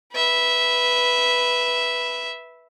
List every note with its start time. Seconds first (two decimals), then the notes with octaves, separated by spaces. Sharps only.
0.13 B4 E5